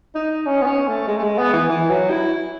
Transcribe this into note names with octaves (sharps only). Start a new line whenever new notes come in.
D#4
C#4
B3
C#4
A3
G#3
A3
G#3
B3
E3
E3
F#3
E4